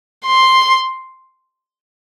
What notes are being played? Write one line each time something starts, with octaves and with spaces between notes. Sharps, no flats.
C6